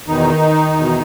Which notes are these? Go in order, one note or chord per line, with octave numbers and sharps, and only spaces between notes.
E2 B2 D#3 D#4
E2 B2